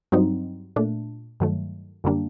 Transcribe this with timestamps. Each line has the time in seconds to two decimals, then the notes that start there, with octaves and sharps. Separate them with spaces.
0.12 G2 F#3 C4 D#4
0.76 A#2 A3 D4
1.40 G2 D#3 F#3 A3
2.04 F#2 D3 G3 A#3 D4